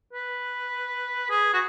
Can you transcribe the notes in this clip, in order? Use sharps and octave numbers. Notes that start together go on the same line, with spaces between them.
B4
G#4
F#4